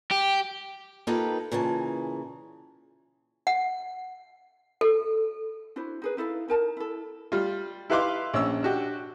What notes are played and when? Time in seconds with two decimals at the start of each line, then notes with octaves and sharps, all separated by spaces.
0.11 G4
1.07 A#3 D#4 F4 G4 A4 B4
1.52 A#2 C#3 E3 G#5 A5
3.47 F#5
4.81 A4
5.76 D4 E4 F#4 C5
6.02 D#4 G#4 B4
6.17 D#4 E4 A4 F5
6.48 D#4 A#4 A5
6.77 E4 A4
7.32 G3 F4
7.90 E4 G4 B4 F5 C6 D6
8.34 A#1 C#4 E6
8.63 D4 F#4 G4